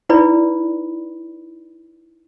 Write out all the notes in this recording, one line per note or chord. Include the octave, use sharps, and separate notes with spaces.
D#4 E4 B4 D5 B5